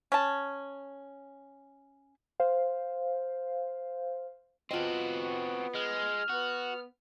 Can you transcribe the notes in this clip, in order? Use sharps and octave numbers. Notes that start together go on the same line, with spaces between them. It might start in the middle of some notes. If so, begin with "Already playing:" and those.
C#4 A5
C5 F5
B3 C4 F4 F#4 D#5
G#3 F6
B3 F#4